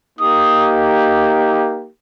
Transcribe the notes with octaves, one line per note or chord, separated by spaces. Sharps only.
A#3 D#4 G4 D#6